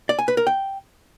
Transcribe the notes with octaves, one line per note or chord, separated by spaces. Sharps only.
D5
G#5
B4
A#4
G5